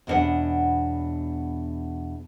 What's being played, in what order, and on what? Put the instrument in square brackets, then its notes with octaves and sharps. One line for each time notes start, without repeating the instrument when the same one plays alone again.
[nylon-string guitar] E2 B2 D#3 C#4 D4 F#5